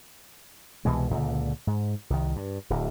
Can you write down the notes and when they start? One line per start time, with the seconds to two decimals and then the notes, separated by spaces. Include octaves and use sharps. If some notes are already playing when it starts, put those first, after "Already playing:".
0.85 C2 B2 E3 G#3
1.11 C#2 A#2 D3
1.67 G#2
2.10 C2 D#3
2.36 G2
2.70 D1 D2